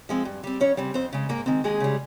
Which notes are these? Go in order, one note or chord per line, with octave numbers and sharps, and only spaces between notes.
F3 G#3 C4
G2
G3 C4
F2 C#4 C#5
C#3 G3 C4
F2 C4 C5
C#3 G#3
G#2 A#3 A#4
D#3 G#3 C4
D#2 G#3 G#4
C#3 G3